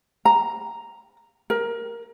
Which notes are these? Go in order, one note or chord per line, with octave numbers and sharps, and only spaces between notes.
A#5
A#4